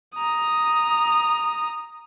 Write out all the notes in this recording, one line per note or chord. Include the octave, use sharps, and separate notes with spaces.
A#5 D#6